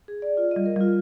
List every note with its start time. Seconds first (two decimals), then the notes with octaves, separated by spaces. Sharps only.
0.08 G#4
0.22 D5
0.37 F4
0.51 G3 D#5
0.66 A#4
0.76 G3 F4